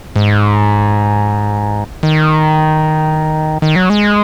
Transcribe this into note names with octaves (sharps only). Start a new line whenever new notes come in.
G#2
D#3
D#3
F#3
G#3